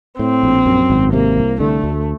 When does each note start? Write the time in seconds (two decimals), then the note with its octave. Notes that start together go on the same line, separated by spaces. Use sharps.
0.19 A2 C4
0.43 A#1
0.66 F#2
0.90 G#1
1.13 C3 A#3
1.37 C2
1.60 D3 A3
1.84 D2